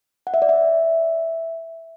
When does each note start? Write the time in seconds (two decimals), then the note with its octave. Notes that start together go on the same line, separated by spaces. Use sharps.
0.27 F#5
0.34 E5
0.42 D5
0.49 E5